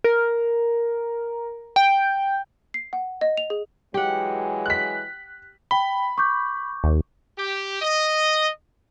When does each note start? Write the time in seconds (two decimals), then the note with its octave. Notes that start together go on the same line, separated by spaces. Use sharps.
0.04 A#4
1.76 G5
2.74 C7
2.93 F#5
3.21 D#5
3.37 F7
3.50 G#4
3.94 E3 F#3 G#3 G4 F#5
4.66 F#6 B6
5.71 G5 B5 G7
6.18 C#6 D6 G6
6.84 D#2
7.38 G4
7.82 D#5